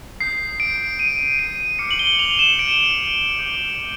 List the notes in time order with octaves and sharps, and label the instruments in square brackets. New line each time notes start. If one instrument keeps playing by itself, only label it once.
[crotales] D#6 G6 C7
D7
D#7
D7
D6 F6 C#7
F#7
G7
F7
E7
D7
D6 G6